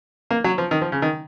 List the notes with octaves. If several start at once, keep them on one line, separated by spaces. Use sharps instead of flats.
A#3
F#3
F3
D#3
F3
C#3
D#3